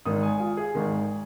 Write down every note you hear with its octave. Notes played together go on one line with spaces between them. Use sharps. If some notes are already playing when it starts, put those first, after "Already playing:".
G#1 G#2 D#3 D#6
G#5
F4
G#4
G#1 G#2 D#3